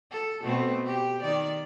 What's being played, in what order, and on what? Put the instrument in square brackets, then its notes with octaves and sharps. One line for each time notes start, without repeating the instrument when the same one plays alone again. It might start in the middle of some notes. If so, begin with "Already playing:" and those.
[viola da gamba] A4
B2 A3 C4
G4
D#3 D5